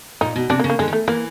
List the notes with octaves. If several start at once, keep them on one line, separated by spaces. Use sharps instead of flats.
A#2 D#4
B2
C3 D4
A#3
C#3
A#3
D3 G#3
D#3
A3
E3 A#3